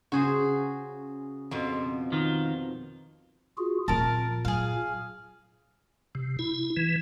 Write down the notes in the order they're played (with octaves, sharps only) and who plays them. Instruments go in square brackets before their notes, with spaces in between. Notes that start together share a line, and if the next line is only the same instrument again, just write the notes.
[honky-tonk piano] C#3 [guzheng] F#4 G#4 C5
[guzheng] F2 B2 F3
[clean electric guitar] D#3 F4
[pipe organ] F4 F#4 G#4
[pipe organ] A#2 [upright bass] F3 C4 [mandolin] A#4 A5
[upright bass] F#3 [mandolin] G#4 F5
[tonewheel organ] C3
E4
E3